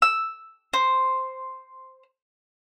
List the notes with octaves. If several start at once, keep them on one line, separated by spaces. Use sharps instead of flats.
E6
C5